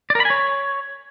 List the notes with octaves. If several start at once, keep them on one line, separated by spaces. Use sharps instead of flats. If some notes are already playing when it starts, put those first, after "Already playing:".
D5
A#4
B5
G#5
C#5